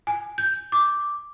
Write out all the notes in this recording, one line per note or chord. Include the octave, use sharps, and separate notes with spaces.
G#5
G6
D6